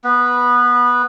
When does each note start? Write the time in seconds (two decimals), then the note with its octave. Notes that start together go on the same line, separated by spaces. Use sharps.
0.04 B3 B4